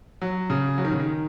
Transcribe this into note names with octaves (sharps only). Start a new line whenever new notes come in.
F#3
C#3
F#3
D#3
C#3
D#3